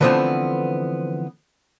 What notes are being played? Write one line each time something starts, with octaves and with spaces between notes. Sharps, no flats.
D3 E3 F3 A3 B3 C4